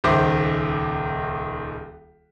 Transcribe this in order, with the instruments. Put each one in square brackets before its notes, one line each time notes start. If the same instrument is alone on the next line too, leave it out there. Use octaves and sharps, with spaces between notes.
[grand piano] D#1 C#2 D#3 C5 E5 D6